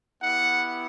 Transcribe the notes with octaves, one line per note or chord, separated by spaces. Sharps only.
B3 E4 G4 F#5